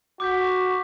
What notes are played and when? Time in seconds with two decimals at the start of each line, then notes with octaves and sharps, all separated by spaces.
0.20 F#4 D6 G6 B6